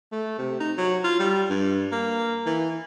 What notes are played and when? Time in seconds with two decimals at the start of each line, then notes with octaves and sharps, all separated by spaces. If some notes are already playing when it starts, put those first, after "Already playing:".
0.12 A3
0.39 C3
0.60 D#4
0.78 F#3
1.04 F4
1.19 G3
1.50 G2
1.92 A#3
2.46 E3